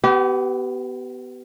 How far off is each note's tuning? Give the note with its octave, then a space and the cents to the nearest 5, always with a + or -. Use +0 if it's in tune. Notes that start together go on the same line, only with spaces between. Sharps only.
B3 +15 G4 -30